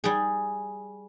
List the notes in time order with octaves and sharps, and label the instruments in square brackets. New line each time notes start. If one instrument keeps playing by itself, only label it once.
[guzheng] G3 G#4